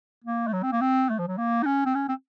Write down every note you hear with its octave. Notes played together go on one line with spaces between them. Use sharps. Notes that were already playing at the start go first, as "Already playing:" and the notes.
A#3
A3
F#3
C4
A#3
C4
A3
F3
F#3
A#3
D#4
C#4
C4
C#4
C4